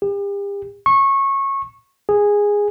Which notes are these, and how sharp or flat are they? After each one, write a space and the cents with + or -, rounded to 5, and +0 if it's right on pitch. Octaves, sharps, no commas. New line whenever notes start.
G4 +40
C#6 -20
G#4 -10